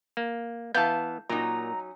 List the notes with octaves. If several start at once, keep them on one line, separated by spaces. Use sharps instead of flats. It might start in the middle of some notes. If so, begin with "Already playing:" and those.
A#3
E3 B3 F5 A5 G6
A#2 F#3 C#4 D#4 A#5